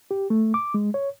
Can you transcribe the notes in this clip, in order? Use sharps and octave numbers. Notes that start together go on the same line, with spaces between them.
G4
A3
D6
G#3
C#5